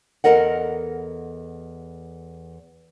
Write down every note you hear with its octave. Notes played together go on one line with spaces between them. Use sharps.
E2 E3 A4 A#4 D#5 F#5